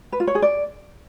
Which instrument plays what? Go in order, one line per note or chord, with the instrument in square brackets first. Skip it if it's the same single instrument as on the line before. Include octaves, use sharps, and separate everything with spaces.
[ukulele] B4
F4
C#5
G#4
D5